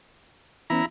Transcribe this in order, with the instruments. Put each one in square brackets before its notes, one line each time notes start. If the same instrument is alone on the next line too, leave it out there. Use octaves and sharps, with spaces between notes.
[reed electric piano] E3 B3 C#4 [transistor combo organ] E4 A#5